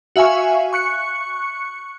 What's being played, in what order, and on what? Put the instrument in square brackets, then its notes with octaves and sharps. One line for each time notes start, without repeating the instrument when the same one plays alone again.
[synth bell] F#4 E5 F5 G#5 C#6
C#6 F#6 C#7